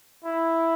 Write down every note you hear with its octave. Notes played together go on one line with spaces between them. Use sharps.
E4